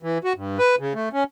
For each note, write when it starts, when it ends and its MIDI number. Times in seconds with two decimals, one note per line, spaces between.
0.03 0.18 52
0.24 0.33 66
0.36 0.58 43
0.58 0.75 71
0.79 0.93 49
0.94 1.09 57
1.13 1.24 61